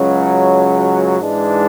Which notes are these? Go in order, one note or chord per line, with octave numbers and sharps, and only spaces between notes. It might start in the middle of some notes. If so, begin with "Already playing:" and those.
Already playing: C#2 C#3 F#3 C#4
G#2 E3 G#3 D4